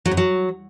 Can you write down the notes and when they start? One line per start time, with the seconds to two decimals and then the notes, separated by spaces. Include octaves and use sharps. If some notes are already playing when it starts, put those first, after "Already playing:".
0.06 F#3
0.11 F#2
0.17 F#3